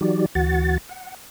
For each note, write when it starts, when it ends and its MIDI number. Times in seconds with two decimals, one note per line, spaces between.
0.01 0.26 52
0.01 0.26 54
0.01 0.26 63
0.01 0.26 66
0.01 0.26 67
0.01 0.26 74
0.35 0.78 38
0.35 0.78 52
0.35 0.78 66
0.35 0.78 78
0.35 0.78 93
0.89 1.15 78